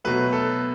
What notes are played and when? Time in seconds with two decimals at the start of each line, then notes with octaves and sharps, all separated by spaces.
0.04 B2 F#3 A3 B4
0.33 A4